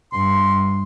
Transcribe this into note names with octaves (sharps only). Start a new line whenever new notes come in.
G2 C6